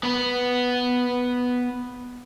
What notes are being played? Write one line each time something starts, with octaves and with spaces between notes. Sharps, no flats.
B3 B4